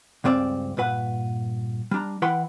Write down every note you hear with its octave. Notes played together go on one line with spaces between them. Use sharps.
C#2 G2 C4 D5
G2 A#2 B4 F#5
G3 D4 A#5
E3 E4 B4 F#5 G5 C6